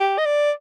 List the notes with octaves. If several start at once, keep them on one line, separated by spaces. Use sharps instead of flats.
G4
D#5
D5